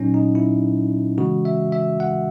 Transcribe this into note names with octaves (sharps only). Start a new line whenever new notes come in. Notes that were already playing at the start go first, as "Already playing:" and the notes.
Already playing: A#2 F#3 C#4 D#4
D#4
E4
C#3 E3 G#3 F#4
E5
E5
F#5